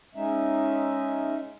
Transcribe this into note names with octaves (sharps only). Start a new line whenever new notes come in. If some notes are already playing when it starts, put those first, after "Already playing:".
G#3 C#4 D#4 E5